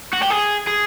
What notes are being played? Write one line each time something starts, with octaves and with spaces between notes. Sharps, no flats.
F#4
G4
G#4
G#4